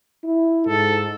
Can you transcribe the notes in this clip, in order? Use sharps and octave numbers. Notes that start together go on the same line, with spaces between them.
E4
G#2 A4